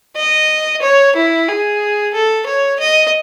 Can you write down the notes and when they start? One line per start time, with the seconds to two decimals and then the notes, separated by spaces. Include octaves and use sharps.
0.16 D#5
0.82 C#5
1.16 E4
1.48 G#4
2.14 A4
2.46 C#5
2.80 D#5